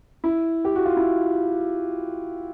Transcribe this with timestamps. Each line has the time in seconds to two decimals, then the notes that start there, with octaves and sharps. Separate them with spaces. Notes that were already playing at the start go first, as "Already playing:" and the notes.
0.24 E4
0.65 G4
0.76 F#4
0.86 F4
0.97 E4